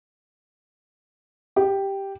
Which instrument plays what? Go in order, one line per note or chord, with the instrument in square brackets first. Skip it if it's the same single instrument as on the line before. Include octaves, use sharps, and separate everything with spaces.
[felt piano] G4